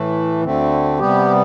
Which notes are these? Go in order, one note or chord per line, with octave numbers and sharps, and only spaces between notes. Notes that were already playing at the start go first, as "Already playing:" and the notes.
Already playing: A2 E3 A3
D2 D3 A3 C4
C3 G3 B3 G4